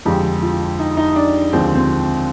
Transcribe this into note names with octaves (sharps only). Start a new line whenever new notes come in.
F2 D3 G#3 G4
F4
D#4
D#4
D4
D#2 D3 F3 G#3 C4
C4